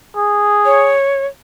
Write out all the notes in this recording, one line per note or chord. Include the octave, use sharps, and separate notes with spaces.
G#4
C#5